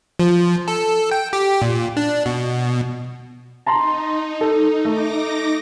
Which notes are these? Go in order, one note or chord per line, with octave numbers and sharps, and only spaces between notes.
F3
A4
G5
G4
A#2
D4
B2
D#4 A5 A#5 C6
A4
A3 D#4 D6 A#6